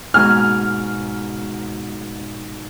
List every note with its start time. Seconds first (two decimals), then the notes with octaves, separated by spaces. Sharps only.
0.14 G#2 B2 G#5 F6